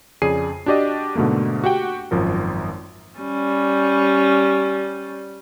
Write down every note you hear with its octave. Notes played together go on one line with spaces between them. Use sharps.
F2 C#3 G#4 D5 C7 D#7
D4 F#4 G4 D5 D#5
G#2 B2 D3 A3 A#3
F#4 G4 F#5 G5
G#1 F#2 F3 A#4
G3 C#4